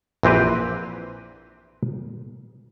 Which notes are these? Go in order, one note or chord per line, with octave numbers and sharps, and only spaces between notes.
A#1 E3 C4 G4 B4